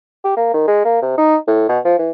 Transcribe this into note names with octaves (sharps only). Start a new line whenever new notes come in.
G4
A#3
D#3
G#3
A#3
C3
D#4
A2
B2
F3
E3